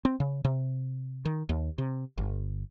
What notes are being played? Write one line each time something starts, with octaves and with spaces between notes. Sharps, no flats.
C4
C#3
C3
D#3
D#2
C3
G1